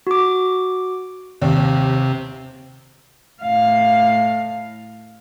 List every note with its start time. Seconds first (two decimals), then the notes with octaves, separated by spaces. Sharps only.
0.07 F#4 D6
1.42 D#2 C3
3.42 A2 F5